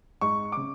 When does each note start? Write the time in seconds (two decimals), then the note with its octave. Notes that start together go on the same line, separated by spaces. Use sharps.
0.21 G#2 C#6
0.52 C#3 D6